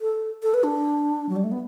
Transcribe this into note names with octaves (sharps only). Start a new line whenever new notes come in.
A4
A4
B4
D4
F#3
G3
A3
B3